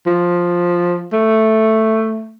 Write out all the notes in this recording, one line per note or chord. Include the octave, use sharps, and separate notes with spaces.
F3
A3